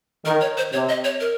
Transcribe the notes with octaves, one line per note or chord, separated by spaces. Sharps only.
D#3 A#4
C#5
C5
C3 C#5
D#5
C#5
A#4